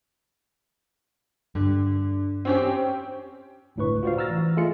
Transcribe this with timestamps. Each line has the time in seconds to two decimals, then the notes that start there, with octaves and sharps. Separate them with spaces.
1.55 G2 D3
2.45 C4 C#4 G4
3.76 G1 C#2 A2 D4 B4 C#6
4.03 F4 F#4 C5 D5 F5
4.18 A#5 E6 F6 A6 A#6
4.30 E3
4.57 A3 F4 G#4 D#5 C#7